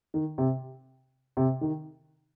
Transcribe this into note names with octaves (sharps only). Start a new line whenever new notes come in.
D#3
C3
C3
D#3